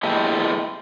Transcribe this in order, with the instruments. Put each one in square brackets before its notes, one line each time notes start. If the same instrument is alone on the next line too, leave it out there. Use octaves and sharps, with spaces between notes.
[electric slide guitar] G#3 B3 E4 G4 A4